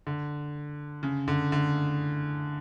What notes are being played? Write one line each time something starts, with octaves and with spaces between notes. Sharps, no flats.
D3
C#3
D3
D3